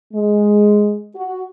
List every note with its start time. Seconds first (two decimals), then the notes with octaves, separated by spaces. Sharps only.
0.13 G#3
1.15 F#4